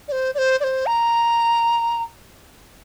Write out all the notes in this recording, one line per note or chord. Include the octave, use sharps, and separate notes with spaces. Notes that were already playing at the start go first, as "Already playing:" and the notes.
D5
C5
D5
C5
D5
C5
A#5